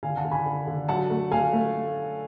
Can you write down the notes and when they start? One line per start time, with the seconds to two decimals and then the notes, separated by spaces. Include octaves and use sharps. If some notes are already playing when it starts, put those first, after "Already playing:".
0.03 D3 F5 G#5
0.17 F#5 A5
0.25 D3
0.31 G#5 B5
0.46 D3
0.67 D3
0.89 F#3 F#5 A5
1.10 A3
1.31 A3 F5 G#5
1.53 A3